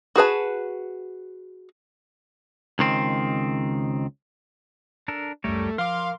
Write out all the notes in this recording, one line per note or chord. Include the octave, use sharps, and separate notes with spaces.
F#4 G#4 B4 A5
C#2 D#3 C4
D4 A4 A#4
G1 C#2 F#2 G3 A3 A#4 C#5
F3 A#4 F5 C6 D6